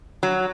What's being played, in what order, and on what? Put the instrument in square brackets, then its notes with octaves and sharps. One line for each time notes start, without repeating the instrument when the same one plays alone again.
[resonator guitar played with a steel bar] F#3